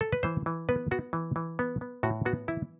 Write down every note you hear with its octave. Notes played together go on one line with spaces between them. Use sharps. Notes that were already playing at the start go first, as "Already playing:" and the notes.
A4
B4
E3 C5
E3
B3 B4
B3 F#4
E3
E3
B3
B3
A2 F#4
B3 F#4
E3 E4